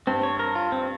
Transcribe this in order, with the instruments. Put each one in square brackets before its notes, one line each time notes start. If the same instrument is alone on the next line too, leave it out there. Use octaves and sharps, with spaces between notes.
[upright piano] G2 [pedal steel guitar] C4
[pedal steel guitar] C#5
A#4
F4
C4